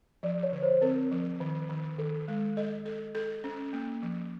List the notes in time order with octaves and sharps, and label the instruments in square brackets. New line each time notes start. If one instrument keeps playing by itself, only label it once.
[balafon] F3 [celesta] D5
[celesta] C#5
[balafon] D3
[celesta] C5
[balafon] C4 [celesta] A#4
[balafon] F3
D#3
D#3
[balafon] D#3 [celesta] A4
[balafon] G#3
[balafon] A4 [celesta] D#5
[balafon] A4
A4
C#4
A#3
F3